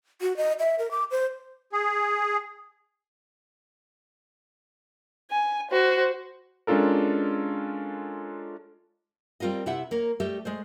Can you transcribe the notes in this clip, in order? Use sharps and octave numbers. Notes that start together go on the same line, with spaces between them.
F#4
D#5
E5
A#4
D6
C5
G#4
G#5
F#4 C5
G#3 C#4 D4 F4 A4 A#4
G3 C4 F4 A#4 D#5
C3 E4 G4 E5 F#5
A#3 A#4 C#5
G3 A3 G4 D#5 E5
G#3 A3 C5